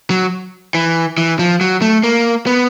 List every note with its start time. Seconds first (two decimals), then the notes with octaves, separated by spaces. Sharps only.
0.10 F#3
0.74 E3
1.18 E3
1.39 F3
1.61 F#3
1.82 A3
2.03 A#3
2.47 B3